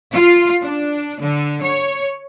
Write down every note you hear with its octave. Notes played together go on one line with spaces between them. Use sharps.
F4
D4
D3
C#5